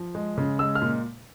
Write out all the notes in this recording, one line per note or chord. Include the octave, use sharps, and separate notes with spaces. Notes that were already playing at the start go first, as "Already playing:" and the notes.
Already playing: F3
G#3
C#3
G#3 E6
F6
A#2